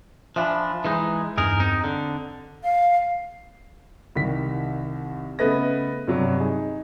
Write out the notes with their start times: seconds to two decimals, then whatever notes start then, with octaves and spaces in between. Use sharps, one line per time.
0.36 F3 D4 E5 G#5 B5
0.85 E3 G#3 D#4
1.37 E2 G2 D#4 G#4 A#4
1.60 C4 D#4
1.84 D3
2.63 F5
4.15 C2 D#3 B6
5.39 C#3 A3 B3 B4 D#5 A#6
6.08 G2 C3 F#3
6.40 D#4 G#4